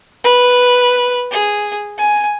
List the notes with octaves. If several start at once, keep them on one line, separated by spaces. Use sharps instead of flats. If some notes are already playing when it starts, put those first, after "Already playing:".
B4
G#4
G#5